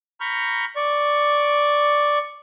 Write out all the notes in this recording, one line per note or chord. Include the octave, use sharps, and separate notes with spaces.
A#5 B5 C#6 F6 G6
D5 C#6